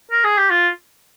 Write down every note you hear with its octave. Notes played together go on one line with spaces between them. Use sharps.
A#4
G#4
G4
F4